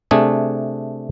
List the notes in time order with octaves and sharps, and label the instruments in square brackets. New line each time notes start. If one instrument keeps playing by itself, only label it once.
[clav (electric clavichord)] C3 A3 D4 G#4 G#5